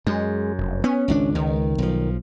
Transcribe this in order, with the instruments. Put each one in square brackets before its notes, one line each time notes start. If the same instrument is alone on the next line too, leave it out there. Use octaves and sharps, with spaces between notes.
[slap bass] F#2 [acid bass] G#3
[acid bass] F1
[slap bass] B3 [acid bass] C#4
[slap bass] G#1 C#2 D4
[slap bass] C#2 [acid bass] D#3
[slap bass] B1 F3